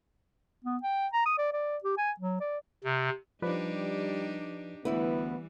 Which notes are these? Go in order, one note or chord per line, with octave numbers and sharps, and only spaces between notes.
B3
G5
A#5
D#6
D5
D5
G4
G#5
F#3
D5
C3
F3 G3 D4 D#4 G4 B4 D5
D2 E3 G3 B3 E4 B4